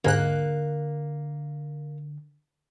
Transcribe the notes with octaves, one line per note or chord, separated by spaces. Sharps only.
D#2 G#2 D3 A#3 F#6